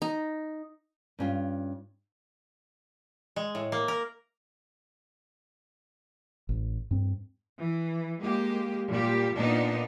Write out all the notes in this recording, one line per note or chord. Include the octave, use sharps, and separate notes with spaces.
D#4
G2 C#4 F4
G#3
A2
A#3
A#4
A1
G2 C4
E3
G#3 A#3 G4
A#2 G3 G4
A#2 B3 D4 D#4